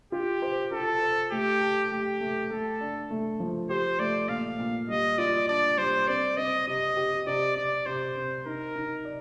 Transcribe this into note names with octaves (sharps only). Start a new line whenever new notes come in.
F4 G4
C5
F4 A4
C5
A3 G4
A4
A3 G4
A3
A3 A4
D4
A3
F3
G4 C5
A3 D5
A#2 F5
A#2
G3 D#5
F4 D5
D4 D5
G3 C5
C4 D5
C4 D#5
C3 D#5
G4
C3 D5
C3 D5
C3 C5
C4
D#4 A#4
D#4
D5